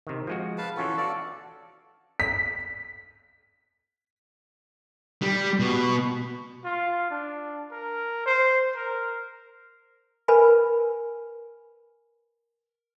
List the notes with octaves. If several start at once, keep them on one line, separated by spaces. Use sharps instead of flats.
C3 D#3
F3 G#3 F#4
B4 F5 A5
E3 C#4 F4 F#4 A4
F#4 A4 D5 F5 A5
B6
G3
B2
F4
D4
A#4
C5
A#4
A#4 B4 G#5 B5